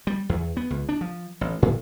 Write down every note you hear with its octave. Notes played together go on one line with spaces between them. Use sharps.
G3
E2
B3
C#2
D4
F3
A1
A2